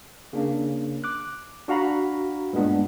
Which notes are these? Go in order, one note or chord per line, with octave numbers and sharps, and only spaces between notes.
C#3 A#3 D4
D6 F#6
D4 F#4 F5 A#5 B5
G2 A#2 G#3 B3 D4